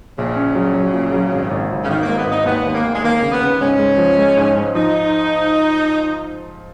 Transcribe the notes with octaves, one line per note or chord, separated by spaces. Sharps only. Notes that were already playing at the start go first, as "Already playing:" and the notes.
A#1 C#3
C#4
F#3
F#3
A#2
F#3
G#1
G#1
G#1
C#3
G#1 D#3
G#2 A#3
B3
G#1
D#4
D#2 B3
D#2
A#3
D#2
G#3
D#2 A#3
C#3
B3
C#3
G#2 C#4
G#3
F3
G#3
G#2
G#2
F3 D#4